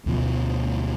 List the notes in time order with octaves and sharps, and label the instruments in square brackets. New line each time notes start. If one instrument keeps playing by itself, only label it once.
[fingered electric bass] D2 B2 F3